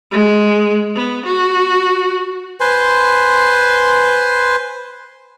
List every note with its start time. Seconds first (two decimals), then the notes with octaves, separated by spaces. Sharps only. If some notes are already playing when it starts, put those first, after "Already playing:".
0.11 G#3
0.96 B3
1.26 F#4
2.60 B4 C5 G#5 C6